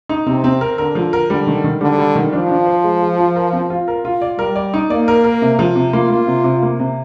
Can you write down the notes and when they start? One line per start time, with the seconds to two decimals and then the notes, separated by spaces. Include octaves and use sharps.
0.09 D#4
0.27 C3 C4
0.44 C4
0.61 A#4
0.78 D3 A#4
0.95 F3
1.13 A#4
1.30 D3 G3
1.47 D#3
1.64 D#3
1.81 D3 G3
1.98 G3
2.15 D#3
2.33 F3 D4
2.50 D4
2.67 C5
2.84 G#3
3.01 G#3
3.19 F4
3.36 A#4
3.53 C4
3.70 F4
3.88 A#4
4.05 F4
4.22 D5
4.38 G3 A#4
4.56 D5
4.74 D#4
4.90 A#3 D5
5.08 A#4
5.24 A#4
5.42 C3
5.59 F3
5.76 C3
5.93 A#3 F4
6.10 A#3
6.27 C3
6.44 C3
6.62 A#3
6.79 C3